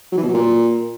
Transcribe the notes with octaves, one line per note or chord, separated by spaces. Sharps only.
F#3
E3
B2
F#3
A#2